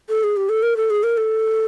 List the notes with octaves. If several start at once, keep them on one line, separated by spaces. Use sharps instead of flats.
A4
G#4
G4
A4
A#4
A4
G#4
A#4
A4